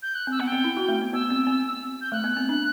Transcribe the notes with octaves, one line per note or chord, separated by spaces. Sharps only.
G6
F#6
C4 E6
B3 F#5
C4 G5
E4
F#4
A3
B3
B3 E6
C4
C4
G6
A3 F#6
B3
C4
D4